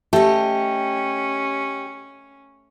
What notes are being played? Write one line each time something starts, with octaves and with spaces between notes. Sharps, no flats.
A3 C#4 G4 D#5